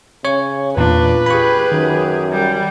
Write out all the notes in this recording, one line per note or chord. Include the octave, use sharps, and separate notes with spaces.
C#3 C#5 C#6
E2 A#2 D4 F4 B4
G4 G#4 B5 C#6
F#2 D#3
G3